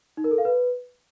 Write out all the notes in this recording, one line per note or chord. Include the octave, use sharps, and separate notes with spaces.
D#4
A#4
A4
F5
B4